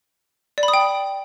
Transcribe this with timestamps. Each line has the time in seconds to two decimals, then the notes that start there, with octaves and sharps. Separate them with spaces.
0.58 D5
0.63 B5
0.68 D#6
0.74 G5